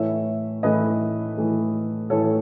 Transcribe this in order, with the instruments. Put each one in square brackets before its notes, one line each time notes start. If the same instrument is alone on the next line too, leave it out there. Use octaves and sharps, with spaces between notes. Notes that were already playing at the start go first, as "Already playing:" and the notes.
Already playing: [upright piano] A2 E3 A3 C#5 E5
A2 E3 A3 B4 D#5
A2 E3 A3
A2 E3 A3 A4 C#5